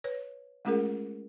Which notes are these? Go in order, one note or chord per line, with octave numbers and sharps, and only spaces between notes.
B4 C#5
G#3 A3 C#4 F4 G#4 A#4